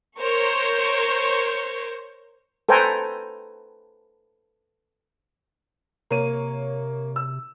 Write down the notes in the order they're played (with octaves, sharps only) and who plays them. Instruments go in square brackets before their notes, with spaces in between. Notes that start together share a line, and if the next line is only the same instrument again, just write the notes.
[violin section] A#4 C5 C#5 C#6
[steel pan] A4 B4 C5 G5 G#5 A#5
[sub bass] C3 [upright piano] A#3 C#5 D#7
[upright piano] E6